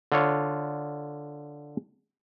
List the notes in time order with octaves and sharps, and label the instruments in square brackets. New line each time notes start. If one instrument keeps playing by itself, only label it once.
[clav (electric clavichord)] D3 F4 C#5